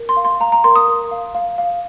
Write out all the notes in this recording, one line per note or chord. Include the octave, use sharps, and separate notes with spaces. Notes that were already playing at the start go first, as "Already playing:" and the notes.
Already playing: A#4
C6
F5
C6
F5 A#5
A#5
A#4 C6
D#6
A#4
F5
F5
F5